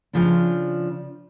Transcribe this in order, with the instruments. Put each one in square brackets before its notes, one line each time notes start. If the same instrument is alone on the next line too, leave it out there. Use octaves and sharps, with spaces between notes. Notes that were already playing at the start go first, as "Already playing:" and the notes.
[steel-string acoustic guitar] C#3 F3 D4